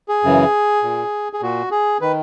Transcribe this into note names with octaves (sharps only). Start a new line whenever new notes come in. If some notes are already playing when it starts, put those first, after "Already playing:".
G#4
F#2 C#3 E3
A#2
G#4
A#2 F#4
G#4
D#3 B4